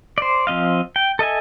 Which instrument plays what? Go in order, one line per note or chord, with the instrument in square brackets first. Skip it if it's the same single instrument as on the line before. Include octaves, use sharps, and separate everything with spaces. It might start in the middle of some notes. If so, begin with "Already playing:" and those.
[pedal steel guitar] C5 D5
F3 C4 D#5 F5
G5
A4 D#5 E5 G#5